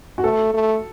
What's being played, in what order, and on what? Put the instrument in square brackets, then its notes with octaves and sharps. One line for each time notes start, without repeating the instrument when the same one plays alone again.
[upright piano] F#4
[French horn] A3 [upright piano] A4
[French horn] A3